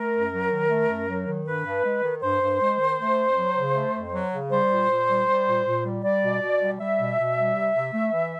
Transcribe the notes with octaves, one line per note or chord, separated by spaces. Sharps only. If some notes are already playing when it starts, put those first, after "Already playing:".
Already playing: A3 A#4
F#2
F#3
D#3
A3
F#2
F#3
D#3
G2 B4
G2
G#3
D#3
G2 C5
G2
G#3
D#3
A3
F2
F#3
C#3
A3
F2
F#3
C#3
G3 C5
A#2
A#2
G3
G3
A#2
A#2
G3
G3 D5
B2
B2
G3
G3 E5
B2
B2
G3
C3
C3
A3
E3